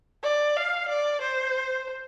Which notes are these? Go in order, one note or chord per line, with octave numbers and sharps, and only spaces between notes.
D5
F5
D5
C5